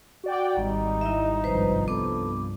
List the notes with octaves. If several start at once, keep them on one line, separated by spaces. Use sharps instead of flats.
F#4 D5 G5
G#1 G3 D#4
E4 D#5 E5
C2 G2 F3 B4 C5
B3 A4 D6